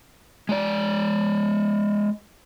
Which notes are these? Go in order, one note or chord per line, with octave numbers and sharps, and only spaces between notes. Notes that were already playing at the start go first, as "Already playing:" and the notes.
G#3 D5